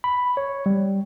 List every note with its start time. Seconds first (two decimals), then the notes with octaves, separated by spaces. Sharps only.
0.04 B5
0.37 C#5
0.66 G3